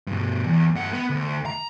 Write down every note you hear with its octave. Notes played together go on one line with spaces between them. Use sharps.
G2 B2
E2
G2 F#5
B3
D2
A#5